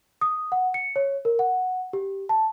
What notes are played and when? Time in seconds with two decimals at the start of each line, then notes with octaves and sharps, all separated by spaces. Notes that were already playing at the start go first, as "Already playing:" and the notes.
0.21 D#6
0.52 F#5
0.74 C#7
0.96 C#5
1.25 A#4
1.39 F#5
1.93 G4
2.29 A5